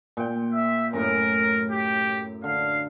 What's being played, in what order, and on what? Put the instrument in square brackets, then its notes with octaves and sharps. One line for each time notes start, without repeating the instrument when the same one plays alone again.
[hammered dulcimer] A#2 G5
[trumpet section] E5
[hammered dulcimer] F#2 A2 [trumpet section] A#4
[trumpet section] G4
[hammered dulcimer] D3 [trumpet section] F5